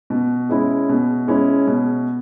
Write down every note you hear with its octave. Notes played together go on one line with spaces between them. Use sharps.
B2
G#3 C#4 E4
B2
G#3 C#4 E4
B2